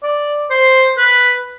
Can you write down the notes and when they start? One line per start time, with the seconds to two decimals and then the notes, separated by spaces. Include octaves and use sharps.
0.03 D5
0.50 C5
0.98 B4